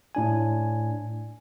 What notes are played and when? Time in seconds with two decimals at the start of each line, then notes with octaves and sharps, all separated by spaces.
0.15 A2 D4 G#5